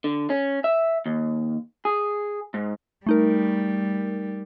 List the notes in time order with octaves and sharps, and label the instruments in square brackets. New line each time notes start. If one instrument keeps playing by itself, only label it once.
[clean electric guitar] D3
C#4
E5
D#2
G#4
G#2
[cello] G3 [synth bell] A3 D#4 A#4